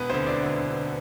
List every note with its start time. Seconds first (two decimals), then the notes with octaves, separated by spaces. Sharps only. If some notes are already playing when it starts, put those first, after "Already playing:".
Already playing: E1 B3 B4
0.09 D2 D3 C4 C5
0.26 E1 D4 D5
0.43 D2 D3
0.60 E1
0.77 D3